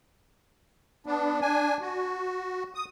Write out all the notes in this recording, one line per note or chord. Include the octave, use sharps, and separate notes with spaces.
B3 D4
D4 G#5
F#4
D#6